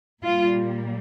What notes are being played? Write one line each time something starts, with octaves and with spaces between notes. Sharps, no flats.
A#2 G3 A#3 F4